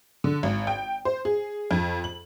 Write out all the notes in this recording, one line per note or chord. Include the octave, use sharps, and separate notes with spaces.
D3
G#1
G5
C5
G#4
F2
F#7